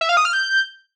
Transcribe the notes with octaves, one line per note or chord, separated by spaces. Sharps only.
E5
F5
D#6
F6
G6